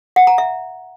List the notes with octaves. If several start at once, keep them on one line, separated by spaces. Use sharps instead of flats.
F#5
A#5
E5